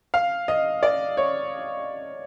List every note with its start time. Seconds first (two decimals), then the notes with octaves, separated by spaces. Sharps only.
0.14 F5
0.48 D#5
0.83 D5
1.17 C#5